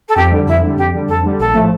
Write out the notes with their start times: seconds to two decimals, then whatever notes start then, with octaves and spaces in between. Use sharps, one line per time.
0.08 A4
0.16 F2 G4
0.31 D3 G3
0.47 F2 E4
0.62 D3 G3
0.77 F2 G4
0.94 D3 G3
1.08 F2 A4
1.23 D3 G3
1.39 A#1 A4
1.54 A2 F3 A3